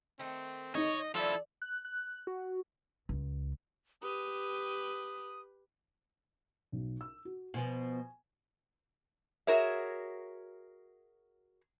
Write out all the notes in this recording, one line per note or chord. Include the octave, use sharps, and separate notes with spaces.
D#3 A3 C4
D#4 C#5 D#5
F3 E4 A4 D5
F#6
F#6
F#4
C#2
G4 B4 D#6
B1
E6
F#4
B2 F3 B3 G#5
F#4 G#4 A#4 C#5 E5